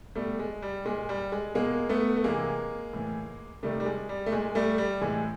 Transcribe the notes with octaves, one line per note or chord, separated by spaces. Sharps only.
B2 G3 A3
G#3
G3
A#2 G#3
G3
G#3
B2 G#3 A#3
A3 B3
A3
C3 E3 G#3 A#3
A2 E3
C3 D#3 G3 A3
G3
G#3
G3
A3
A#2 G#3
G3 A3
G3
A2 E3 G#3